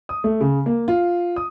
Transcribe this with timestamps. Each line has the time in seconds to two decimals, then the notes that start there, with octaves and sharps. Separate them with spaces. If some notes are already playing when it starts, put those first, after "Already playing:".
0.09 D#6
0.24 A3
0.41 C#3
0.66 A#3
0.88 F4
1.36 D#6